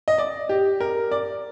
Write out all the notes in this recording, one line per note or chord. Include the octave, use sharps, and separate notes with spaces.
D#5
D5
G4
A#4
D5